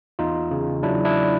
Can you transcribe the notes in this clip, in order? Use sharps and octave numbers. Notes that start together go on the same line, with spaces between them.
E2 D#4 F4
C#3
F#3 D4 E4
D4 E4